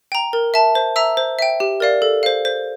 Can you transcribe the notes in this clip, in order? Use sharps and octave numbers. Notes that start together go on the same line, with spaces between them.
G5 A#5
A#4
E5 A5
C5
E5 A#5 E6
C5
E5 G5
G4
A#4 D5 F5
A4
C5 F5
C5